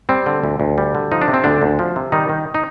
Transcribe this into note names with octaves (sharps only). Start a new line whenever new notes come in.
G3 C4
D3
D2
D2
G3
D3
F3 D#4
D4
C3
C4
D2 D3 D4
D2
F3
C3
D#3 G3 D#4
D#3
D#4